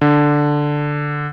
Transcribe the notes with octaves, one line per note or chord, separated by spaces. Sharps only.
D3